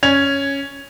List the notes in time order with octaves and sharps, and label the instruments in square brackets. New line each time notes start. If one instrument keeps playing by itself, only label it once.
[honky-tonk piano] C#4 G#6 F7